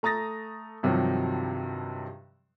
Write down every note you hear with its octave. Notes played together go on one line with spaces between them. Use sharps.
A3 A#5 D#6 A6 A#6
G2 C3 D#3 F3 F#3